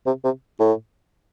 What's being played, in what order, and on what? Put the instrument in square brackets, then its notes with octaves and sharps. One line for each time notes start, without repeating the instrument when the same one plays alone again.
[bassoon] C3
C3
A2